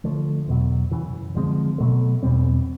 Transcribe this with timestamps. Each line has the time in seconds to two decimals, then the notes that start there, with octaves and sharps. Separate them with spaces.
0.04 D3 F3 A3
0.48 E2 B2 F#3
0.91 F#2 C#3 E3
1.35 D3 F3 G#3 C4
1.78 B2 F#3 A3
2.23 E2 B2 G3 C4